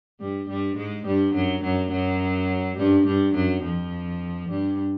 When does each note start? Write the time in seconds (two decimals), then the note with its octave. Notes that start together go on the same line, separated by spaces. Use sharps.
0.20 G2 G3
0.49 G2 G3
0.77 G#2 G#3
1.06 G2 G3
1.34 F#2 F#3
1.63 F#2 F#3
1.92 F#2 F#3
2.77 G2 G3
3.06 G2 G3
3.35 F#2 F#3
3.63 F2 F3
4.49 G2 G3